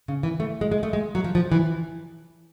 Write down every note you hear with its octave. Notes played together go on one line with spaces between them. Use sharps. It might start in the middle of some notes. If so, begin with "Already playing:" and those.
C#3
E3
A3
G#3
G#3
A3
G#3
F#3
F3
F3
E3